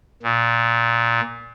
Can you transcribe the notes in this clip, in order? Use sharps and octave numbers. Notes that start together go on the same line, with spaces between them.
A#2